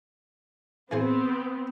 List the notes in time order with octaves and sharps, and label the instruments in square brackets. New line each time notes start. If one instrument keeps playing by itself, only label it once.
[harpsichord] E3 G#4 C5 [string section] B3 C4